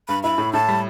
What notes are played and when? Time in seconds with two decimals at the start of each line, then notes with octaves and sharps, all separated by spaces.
0.08 G2 B5
0.23 E4 B5
0.38 A2
0.53 A2 A5
0.68 G3